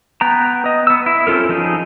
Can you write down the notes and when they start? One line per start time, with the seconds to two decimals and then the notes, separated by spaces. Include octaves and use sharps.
0.21 B3 G5 A#5
0.66 D#5
0.87 B3 E6
1.06 E4
1.27 C4 C#4 F4 A4 A#4
1.49 F3 D#4 G#4